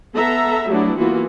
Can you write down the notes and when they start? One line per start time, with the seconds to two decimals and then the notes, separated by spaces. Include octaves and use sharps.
0.15 B3 A4 E5 A#5
0.68 F#3 G3 A3 B3 D4 E4
0.97 E3 A#3 B3 F4 F#4